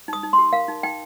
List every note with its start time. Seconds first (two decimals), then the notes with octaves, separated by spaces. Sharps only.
0.08 D#4 D#6
0.23 D#4
0.33 C6
0.38 G4
0.53 A#4 F5
0.68 D#4
0.83 D#4 G5